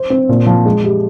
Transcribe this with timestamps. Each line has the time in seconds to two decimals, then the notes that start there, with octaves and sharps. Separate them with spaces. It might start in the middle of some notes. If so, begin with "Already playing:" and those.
Already playing: C5
0.10 C4
0.29 A#2
0.46 F3
0.66 G#3
0.84 G4